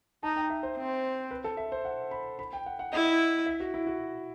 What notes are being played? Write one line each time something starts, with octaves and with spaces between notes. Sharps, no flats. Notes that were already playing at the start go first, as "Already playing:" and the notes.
D#4 A5
G5
E5
C5
C4
B4
A4
E5
C5
F#5
B5
B5
G5
F#5
F#5
E4 D#5
E5
F#4
E4
F#4